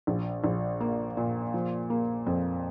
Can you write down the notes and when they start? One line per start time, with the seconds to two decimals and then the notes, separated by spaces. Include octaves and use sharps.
0.07 A#1
0.44 A#1
0.80 A#3
1.17 A#2
1.54 F3
1.90 A#3
2.27 F2